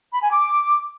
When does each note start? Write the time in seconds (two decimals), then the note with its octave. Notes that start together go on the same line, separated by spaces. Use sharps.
0.13 B5
0.22 G#5
0.31 D6